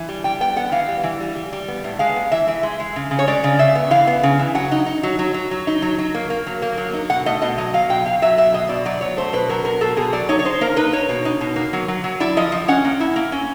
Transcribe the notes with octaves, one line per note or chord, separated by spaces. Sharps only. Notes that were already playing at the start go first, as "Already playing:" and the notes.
Already playing: E3
G3
G3 G5
B3 G5
B3 F#5
E3 F5
G3
E3
G3
G3
G3
B3
A2
G#3 F5
B3
E3 E5
E3
G#3
G#3
C#3
C#3
C#5
G#3 D5
C#3
C#3 E5
B3
E3 F5
B3
C#3
E3
F#3 F#5
D#4
D#4
F#3
F#3
F#3
F#3
D#4
F#3
F#3
A#3
A#3
F#3
A#3
F#3
D#4
B2 F#5
A3 D#5
B2 D#5
F#3 D#5
F#3 F5
B2 G5
B2 F5
F#3 E5
B2 E5
B2 D#5
B2 D5
F#3 D5
F#3 C#5
A3 C5
B2 B4
F#3 A#4
B2 A#4
B2 A4
B2 G#4
F#3 D5
D#4 C#5
C#5
D#4 C5
A#3 A#4
D#4 B4
D#4 C#5
B2
D#4
B2
A#3
F#3
F#3
F#3
E4 D5
F3 D#5
F3
C#4 F#5
A#3
E4
A#3
C#4